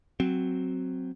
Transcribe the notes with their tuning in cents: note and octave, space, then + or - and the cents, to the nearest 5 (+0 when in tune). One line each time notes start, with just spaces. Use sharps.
F#3 +0 C4 +0